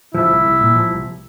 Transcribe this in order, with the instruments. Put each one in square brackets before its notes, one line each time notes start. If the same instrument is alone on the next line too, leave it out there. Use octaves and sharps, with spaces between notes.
[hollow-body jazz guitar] F3 [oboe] E4
[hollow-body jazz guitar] C2
C2
A#2
F3
C2